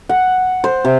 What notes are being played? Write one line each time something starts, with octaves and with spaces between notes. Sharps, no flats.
F#5
C5
C3